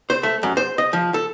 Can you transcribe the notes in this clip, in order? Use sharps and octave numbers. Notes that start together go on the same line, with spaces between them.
C5
A3
F#2
C5
D#5
F3
A4